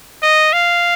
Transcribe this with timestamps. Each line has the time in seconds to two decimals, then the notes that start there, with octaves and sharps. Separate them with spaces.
0.23 D#5
0.53 F5